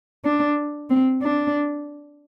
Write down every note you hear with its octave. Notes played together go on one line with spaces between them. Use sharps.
D4
C4
D4